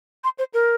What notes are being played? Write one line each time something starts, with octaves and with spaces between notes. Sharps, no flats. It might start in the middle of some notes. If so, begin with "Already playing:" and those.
C6
C5
A#4